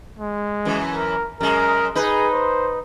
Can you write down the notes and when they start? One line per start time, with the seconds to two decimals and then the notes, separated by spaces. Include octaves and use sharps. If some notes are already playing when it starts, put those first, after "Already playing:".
0.19 G#3
0.65 F#2 E3
0.95 A#4
1.41 F#2 G#3 A#4
1.95 D#4 G#4 B4
2.33 C5